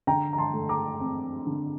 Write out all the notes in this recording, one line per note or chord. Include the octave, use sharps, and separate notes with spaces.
D3 G5 A#5
A#5
A5 C6
A3
A#5 D6
C4
D3